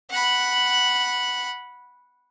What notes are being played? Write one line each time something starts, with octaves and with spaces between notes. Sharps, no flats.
F#5 B5